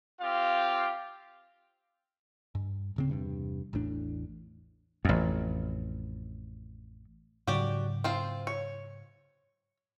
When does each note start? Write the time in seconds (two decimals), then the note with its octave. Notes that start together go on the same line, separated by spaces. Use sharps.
0.21 C4 F4 G4 F5
2.55 G2
2.96 D1 C#3 C4
3.09 E2 G2 C3
3.73 A1 E2 A2 D4
5.05 A1 F2
7.47 G#2 C#3 F#3 F#4 G4 D5
8.04 C4 F4 C5
8.47 C#5